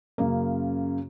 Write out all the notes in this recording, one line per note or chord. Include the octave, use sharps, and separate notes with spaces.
F#2 C#3 A#3